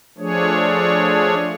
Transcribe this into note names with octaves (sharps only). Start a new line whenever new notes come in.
F3 A3 D4 G#4 C#5